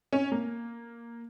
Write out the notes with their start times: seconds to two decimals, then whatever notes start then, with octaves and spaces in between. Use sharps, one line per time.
0.13 C#4
0.32 A#3